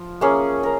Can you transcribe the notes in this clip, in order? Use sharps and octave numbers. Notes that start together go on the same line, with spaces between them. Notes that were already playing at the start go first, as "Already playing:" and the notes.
Already playing: F3
A#3 C#4 G#4
A#4